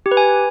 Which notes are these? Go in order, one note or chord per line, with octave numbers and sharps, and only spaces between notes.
G4
B4
G#5